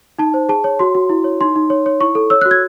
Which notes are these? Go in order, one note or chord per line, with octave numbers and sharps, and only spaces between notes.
D#4 A5
C5
G#4 A5
C#5
F#4 C6
F#4
E4
C#5
D#4 C6
D#4
C#5
C#5
E4 C#6
A4
C#5 E6
F#4 F#6
G#6